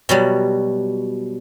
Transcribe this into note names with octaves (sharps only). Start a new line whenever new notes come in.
B2 F#3 G3